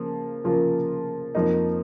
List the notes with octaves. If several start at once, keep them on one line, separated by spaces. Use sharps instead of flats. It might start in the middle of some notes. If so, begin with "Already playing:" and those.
Already playing: C#3 F3 A#3
C#3 F3 A#3 F4 A#4
F2 F3 A#3 D#4